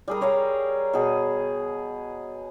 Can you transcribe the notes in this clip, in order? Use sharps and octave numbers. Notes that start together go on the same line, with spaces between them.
G3 G#4 A#4
A#4 C#5 F5 A#5
B2 G#4